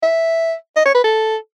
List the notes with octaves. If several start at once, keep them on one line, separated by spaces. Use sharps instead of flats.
E5
D#5
C#5
B4
A4